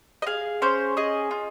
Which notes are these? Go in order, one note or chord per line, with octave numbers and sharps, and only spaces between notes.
D#5
G#4 F5
C#4 C5
G#4 D#5
F4